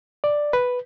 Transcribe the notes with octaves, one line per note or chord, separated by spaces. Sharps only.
D5
B4